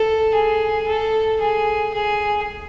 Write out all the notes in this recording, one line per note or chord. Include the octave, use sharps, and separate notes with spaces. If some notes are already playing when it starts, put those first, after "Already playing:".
Already playing: A4
G#4
A4
G#4
G#4